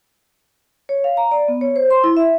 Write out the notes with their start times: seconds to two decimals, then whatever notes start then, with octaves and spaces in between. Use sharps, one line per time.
0.89 C#5
1.04 F5
1.17 A#5
1.31 D5
1.48 B3
1.61 C#5
1.76 C5
1.90 C6
2.04 E4
2.17 E5